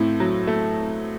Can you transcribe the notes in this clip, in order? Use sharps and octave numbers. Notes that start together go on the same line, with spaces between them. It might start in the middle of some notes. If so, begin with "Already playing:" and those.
Already playing: A2 A3 C4
F#3
A3